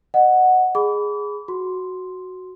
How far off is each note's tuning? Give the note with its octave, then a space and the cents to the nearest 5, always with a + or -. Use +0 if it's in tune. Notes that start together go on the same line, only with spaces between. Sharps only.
D#5 -25 F#5 -5
G#4 +0 B5 +0 D6 -35
F#4 +0 C6 +0